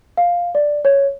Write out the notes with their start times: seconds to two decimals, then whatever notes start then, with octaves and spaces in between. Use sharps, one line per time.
0.17 F5
0.55 D5
0.85 C#5